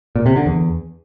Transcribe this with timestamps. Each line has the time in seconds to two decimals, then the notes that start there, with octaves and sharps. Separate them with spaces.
0.15 A#2
0.26 C3
0.36 D3
0.46 E2